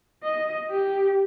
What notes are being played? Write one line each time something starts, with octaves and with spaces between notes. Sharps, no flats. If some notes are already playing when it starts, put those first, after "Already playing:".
D#5
G4